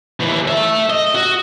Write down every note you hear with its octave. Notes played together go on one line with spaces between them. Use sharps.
D#2 E3
A3 E5
D#5
F#4